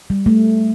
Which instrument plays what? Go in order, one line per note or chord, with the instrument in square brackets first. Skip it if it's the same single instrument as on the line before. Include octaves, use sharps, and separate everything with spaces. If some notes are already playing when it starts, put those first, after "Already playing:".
[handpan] G3
A3